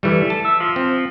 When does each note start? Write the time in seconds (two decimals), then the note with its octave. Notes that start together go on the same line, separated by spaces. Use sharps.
0.03 E3 G3 A3
0.30 A5
0.45 E5
0.60 F3
0.76 C4